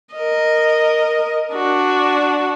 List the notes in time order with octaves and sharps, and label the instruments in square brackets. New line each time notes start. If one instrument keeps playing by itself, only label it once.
[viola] A#4 D#5
D4 F#4